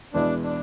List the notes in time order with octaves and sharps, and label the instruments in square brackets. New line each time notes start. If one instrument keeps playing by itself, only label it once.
[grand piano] E2 B2 G#3 B3 E4 [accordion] D4
[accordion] D4